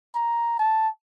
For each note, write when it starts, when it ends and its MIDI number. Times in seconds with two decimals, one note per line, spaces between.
0.15 0.58 82
0.59 0.88 81